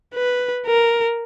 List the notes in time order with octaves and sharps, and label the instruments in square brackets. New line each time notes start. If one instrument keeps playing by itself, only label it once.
[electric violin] B4
A#4